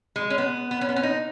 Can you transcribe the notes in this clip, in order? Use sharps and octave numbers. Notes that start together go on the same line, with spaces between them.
G#3
C#4
B3
B3
C#4
B3
C#4
D#4